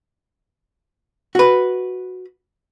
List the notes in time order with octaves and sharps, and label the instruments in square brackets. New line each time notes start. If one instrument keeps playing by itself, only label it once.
[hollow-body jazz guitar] F#4 B4